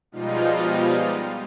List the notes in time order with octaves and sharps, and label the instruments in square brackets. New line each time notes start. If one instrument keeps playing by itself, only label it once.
[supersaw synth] B2 F3 G3 G#3 D#4 F4